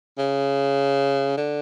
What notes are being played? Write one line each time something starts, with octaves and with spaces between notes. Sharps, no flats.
C#3
D3